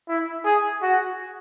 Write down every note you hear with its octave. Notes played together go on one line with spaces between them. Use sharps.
E4
G#4
F#4